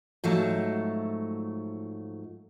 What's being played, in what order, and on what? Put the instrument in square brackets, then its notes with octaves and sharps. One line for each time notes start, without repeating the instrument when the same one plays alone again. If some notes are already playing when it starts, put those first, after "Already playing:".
[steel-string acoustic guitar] G#2 F3 F#3 A3